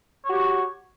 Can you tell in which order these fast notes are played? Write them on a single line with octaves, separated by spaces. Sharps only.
C#5 F#4 G4